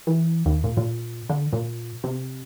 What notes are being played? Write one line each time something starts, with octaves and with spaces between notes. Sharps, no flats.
E3
D#2
A#2
A#2
D3
A#2
C3